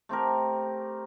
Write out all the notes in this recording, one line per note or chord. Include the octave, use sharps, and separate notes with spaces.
A3 C4 G4 A#4